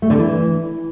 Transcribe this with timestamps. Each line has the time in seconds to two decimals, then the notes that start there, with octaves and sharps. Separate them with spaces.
0.02 A3
0.10 D3
0.18 E3